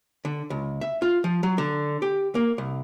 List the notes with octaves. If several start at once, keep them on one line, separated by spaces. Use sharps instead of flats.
D3
C#2
E5
F4
F3
F#3
D3
G4
A#3
C2